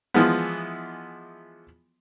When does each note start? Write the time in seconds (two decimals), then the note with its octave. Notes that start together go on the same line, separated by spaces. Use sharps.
0.14 E3 F3 G#3 B3